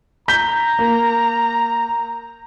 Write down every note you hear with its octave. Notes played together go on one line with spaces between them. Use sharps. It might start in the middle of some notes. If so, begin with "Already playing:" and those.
A#5 G6 B6 G7
A#3